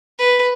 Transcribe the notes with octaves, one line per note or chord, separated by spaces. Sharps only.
B4